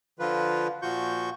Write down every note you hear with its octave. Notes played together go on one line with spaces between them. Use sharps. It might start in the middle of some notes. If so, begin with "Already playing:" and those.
D3 F3 F4 B4
A#2 F3 F4 F#4 C#6 G6